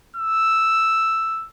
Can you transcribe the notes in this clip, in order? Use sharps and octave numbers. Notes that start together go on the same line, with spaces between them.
E6